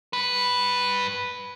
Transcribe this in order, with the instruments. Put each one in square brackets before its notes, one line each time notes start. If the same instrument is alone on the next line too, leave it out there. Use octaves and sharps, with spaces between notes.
[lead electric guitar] G2 B4